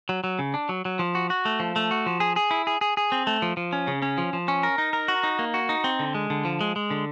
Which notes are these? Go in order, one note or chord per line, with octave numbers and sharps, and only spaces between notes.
F#3
F#3
C#3
D4
F#3
F#3
F3
F#4
F#4
A3
F3
A3
F#4
F3
G#4
G#4
E4
G#4
G#4
G#4
C4
A3
F3
F3
C#4
C#3
C#4
F3
F3
C#4
A#4
D#4
A#4
F#4
D#4
A#3
F#4
D#4
C4
D3
G#3
D3
F3
G#3
G#3
D3